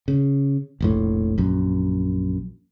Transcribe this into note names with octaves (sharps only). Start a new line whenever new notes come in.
C#3
F1 A#1 A2
A#1 F#2